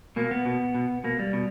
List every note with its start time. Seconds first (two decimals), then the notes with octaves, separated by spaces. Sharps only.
0.16 B2 A#3
0.31 B3
0.45 B2
0.75 B2
1.04 B2 A#3
1.19 G3
1.33 B2